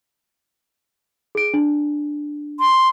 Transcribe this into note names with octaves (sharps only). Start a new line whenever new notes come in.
G#4 D7
D4
C6